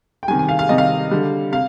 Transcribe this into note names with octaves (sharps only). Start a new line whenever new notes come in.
G5
C3 D#3 G3 G#5
G#5
F5
F5
C3 D#3 G3 D#5
F5
D3 G3
C3 F5